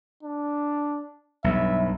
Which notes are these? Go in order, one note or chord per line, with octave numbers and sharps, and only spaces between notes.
D4
B1 G2 E5